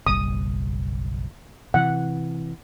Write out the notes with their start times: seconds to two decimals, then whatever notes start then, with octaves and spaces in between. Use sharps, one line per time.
0.07 F#1 B1 G3 D#6
1.74 C3 E3 F#5